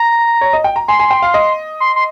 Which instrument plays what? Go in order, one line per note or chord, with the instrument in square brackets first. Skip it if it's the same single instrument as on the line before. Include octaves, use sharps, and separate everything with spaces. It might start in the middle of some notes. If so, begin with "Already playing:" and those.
Already playing: [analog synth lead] A#5
[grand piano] C#5
D#5
G5
A#5
[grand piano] G#5 [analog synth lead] C6
[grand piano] G#5
G5
F5
D#5
[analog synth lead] C6
C6